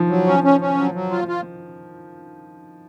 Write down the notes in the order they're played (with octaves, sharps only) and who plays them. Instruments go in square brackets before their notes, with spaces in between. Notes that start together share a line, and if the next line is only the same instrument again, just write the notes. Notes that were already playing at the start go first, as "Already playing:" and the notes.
Already playing: [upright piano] D#3 F3
[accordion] F#3
C#4
C#4
C#4
F#3
F#3
F4
F4